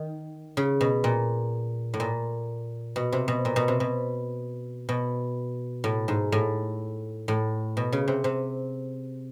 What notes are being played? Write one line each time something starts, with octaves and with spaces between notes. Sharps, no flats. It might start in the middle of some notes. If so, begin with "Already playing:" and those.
Already playing: D#3
C#3
B2
A#2
A2
A#2
B2
C3
B2
A#2
B2
C3
B2
B2
A2
G#2
A2
A2
B2
C#3
C3
C3